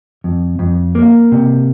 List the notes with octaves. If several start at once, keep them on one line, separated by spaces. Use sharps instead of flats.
F2
F2
A#3
C3